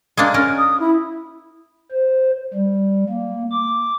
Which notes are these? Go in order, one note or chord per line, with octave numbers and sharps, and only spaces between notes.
G#3 A#3 D4
C#4 A#4
D#6
E4
C5
G3
A#3
D6